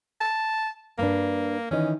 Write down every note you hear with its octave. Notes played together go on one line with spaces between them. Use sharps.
A5
G2 A#3 D4
D#3 E3 C#4 D#5